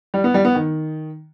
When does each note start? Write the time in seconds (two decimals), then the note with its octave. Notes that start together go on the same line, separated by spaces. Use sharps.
0.14 G3
0.24 B3
0.34 G3
0.45 B3
0.55 D#3